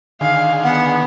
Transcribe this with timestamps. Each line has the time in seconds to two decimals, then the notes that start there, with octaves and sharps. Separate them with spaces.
0.21 D3 D#3 G#4 F5
0.64 B3 F#5